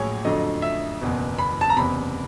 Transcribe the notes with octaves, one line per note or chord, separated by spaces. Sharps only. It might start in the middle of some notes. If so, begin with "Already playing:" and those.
Already playing: A#1 A2 F#3 A#3 G#4 C#5
F2 D3 F#3 A3 D#5
E5
F#1 E2 B2
B5
A5
A#5
F#1 E2 C3 B5